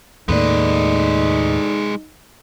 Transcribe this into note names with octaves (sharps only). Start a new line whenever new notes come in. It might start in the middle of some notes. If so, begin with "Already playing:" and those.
D#2 A2 G#3 A#3 D#4 A4 B4 D5